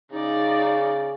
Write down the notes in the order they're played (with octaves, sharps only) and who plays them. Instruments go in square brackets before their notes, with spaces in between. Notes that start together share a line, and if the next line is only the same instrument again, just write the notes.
[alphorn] C#3 [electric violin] D#4 D5